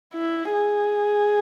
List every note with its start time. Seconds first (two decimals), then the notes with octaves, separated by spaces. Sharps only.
0.14 E4
0.53 G#4